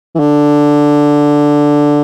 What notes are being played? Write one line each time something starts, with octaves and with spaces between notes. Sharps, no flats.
E3
D3